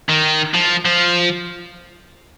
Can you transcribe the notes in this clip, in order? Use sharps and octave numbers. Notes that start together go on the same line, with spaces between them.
D#3
F3
F3